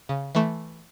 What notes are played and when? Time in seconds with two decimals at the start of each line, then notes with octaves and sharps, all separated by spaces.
0.09 C#3
0.35 E3 A3